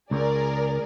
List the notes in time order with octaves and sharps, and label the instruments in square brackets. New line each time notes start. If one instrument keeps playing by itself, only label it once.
[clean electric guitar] C#2 [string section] G#4 A#4 D5